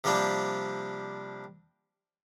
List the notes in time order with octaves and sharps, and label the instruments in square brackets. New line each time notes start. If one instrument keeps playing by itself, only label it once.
[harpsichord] C3 F3 G3 A#3 D4